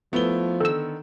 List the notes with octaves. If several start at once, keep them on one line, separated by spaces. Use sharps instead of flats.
F3 A3 B3 E4 G7
D3 D#3 A4 E6